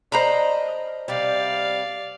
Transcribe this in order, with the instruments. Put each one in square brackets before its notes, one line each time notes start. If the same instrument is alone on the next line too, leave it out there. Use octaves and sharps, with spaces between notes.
[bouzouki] D4 A#4 [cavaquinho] C5 A#5 B5 [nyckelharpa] D#5
[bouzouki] C3 G3 [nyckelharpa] D5 F5